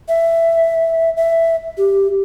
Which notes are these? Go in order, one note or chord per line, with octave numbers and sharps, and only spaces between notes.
E5
E5
G4